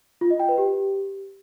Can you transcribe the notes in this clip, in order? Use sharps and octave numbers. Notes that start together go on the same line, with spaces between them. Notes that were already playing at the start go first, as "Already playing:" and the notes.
F4
D#5
G5
B4
G4